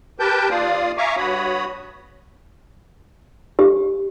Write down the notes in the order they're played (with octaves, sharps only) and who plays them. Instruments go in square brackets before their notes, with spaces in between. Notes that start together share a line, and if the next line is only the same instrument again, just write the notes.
[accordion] G4 A#4 B4 G5 A5 G6
D#2 A#3 F4 D5 F5 D#6
E5 F5 G#5 A#5 C#6 D6
G2 F#4 C#5 B5 D#6
[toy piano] G4